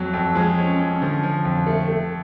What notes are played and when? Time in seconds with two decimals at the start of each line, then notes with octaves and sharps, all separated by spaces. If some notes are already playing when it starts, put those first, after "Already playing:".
Already playing: F2 F#3
0.14 F2
0.35 F3 G#3
0.58 C#4
0.80 C#4
1.02 D3 F3
1.23 F3
1.45 F2
1.67 A3
1.88 A3